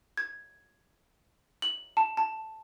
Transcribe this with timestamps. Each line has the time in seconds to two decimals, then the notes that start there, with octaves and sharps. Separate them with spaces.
0.17 G#6
1.62 F#7
1.97 A5
2.17 A5